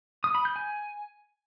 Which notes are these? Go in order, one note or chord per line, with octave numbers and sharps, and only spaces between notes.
D#6
B5
G6
G#5